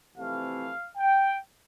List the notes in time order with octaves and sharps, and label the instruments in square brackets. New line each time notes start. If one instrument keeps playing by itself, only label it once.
[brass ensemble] F2 C3 E3 A3 C4 F5
G5